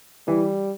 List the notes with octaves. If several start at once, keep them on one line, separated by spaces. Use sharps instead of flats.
E3 G3